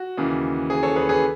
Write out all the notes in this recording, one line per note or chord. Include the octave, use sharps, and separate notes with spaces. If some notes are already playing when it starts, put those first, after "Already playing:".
Already playing: F#4
D#2 C#3 E3
G#4
A4 C#5
G#4 B4
G#4 B4